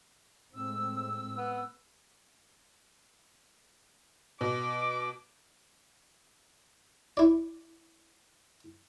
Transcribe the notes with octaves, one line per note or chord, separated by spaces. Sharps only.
A2 G#3 C4 E6
B3
B2 D6
E4 D5